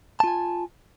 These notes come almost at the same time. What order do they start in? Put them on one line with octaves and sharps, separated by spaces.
A5 F4 G#5